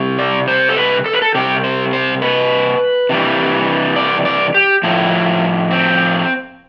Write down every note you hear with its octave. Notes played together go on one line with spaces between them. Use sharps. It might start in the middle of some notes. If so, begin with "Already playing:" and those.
Already playing: C3 G3
D5
C5
A4
B4
A4
B4
A4
C3 G3 G4
C5
C5
B4
C3 E3 G3
D5
D5
G4
A2 F3 E4
C4